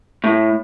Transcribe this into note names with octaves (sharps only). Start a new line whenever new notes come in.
A2